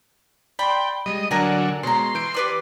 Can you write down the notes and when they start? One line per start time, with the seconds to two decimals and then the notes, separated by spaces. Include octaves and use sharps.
0.59 D5 G5 B5 C6
1.06 G3 G#3 D#5
1.31 D3 F#3 A4 A#4 D5 G#5 A#6 D#7
1.83 B2 G#3 C#5 A#5 C6
2.15 E3 G6 D7
2.34 G4 B4 D5